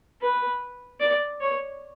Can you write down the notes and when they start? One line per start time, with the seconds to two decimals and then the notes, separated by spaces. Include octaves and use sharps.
0.21 B4
1.01 D5
1.41 C#5